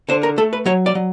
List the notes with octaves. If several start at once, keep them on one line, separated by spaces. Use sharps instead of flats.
D3 C5
A#4
A3 A4
B4
F#3 C#5
D5
F#3